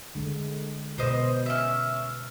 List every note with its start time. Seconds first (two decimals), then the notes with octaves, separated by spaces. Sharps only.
0.15 D3 G#3
0.98 B2 B4 C5 D#5
1.46 C#4 E5